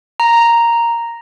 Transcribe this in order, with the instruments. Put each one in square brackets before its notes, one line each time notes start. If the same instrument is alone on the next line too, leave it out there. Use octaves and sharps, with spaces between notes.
[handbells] A#5